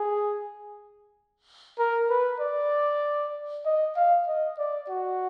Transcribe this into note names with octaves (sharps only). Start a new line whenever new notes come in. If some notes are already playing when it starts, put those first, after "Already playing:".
Already playing: G#4
A#4
B4
D5
D#5
F5
D#5
D5
F#4